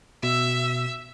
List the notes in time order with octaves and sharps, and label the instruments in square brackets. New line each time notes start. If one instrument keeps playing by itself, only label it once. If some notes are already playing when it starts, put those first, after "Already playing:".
[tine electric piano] B2 [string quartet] E5 E6